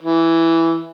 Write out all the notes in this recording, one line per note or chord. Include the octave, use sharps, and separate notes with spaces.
E3